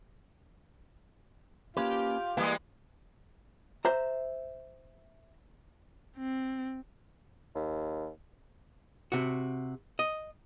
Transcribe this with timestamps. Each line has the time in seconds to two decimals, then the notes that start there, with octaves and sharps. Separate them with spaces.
1.77 A#3 C#4 F4 G4 B4
2.37 E3 G3 G#3 A#3
3.85 C5 E5 A#5
6.17 C4
7.55 D#2
9.12 C3 F#4
9.99 D#5